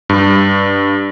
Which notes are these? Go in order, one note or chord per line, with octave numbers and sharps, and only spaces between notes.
G2